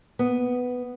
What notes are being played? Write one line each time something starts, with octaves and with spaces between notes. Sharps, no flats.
B3